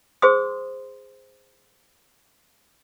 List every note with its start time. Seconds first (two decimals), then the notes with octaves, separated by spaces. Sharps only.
0.22 G#4 C5 C6 D#6